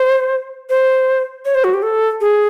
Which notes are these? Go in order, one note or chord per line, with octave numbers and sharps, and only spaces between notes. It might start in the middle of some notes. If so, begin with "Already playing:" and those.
Already playing: C5
C5
C#5
C5
F#4
G4
A4
G#4